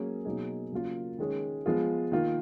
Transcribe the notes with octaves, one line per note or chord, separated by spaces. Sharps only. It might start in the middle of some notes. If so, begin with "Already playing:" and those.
Already playing: F#3 A#3 C#4 G#4
B2 F#3 A#3 D#4 G#4
C#3 F#3 A#3 F4
D#3 G#3 C#4 G#4
F3 G#3 B3 F4 G#4
D#3 A#3 F4